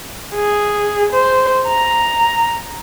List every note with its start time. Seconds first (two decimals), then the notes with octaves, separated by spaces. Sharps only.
0.34 G#4
1.12 C5
1.67 A#5